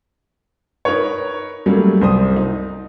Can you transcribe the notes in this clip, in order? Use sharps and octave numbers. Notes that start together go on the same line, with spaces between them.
D#4 A#4 B4 C#5
F#3 G3 A3 A#3 C#4
C2 C5 D#6
D#4